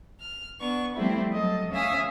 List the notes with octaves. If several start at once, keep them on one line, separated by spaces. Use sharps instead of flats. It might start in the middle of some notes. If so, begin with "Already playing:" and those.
F6
B3 D4 C#6
F3 G3 A3 C4 E4
F#3 A4 D#5
D2 C#4 E5 F5 G#5 D#6